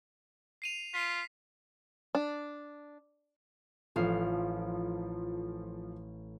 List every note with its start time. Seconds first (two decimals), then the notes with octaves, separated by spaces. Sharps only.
0.62 C7 D#7 F7
0.94 F4 B6 C7 D#7
2.15 D4
3.96 A1 F3 F5